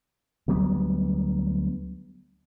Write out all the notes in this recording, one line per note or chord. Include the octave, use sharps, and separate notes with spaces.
D2 F#3 G3 B3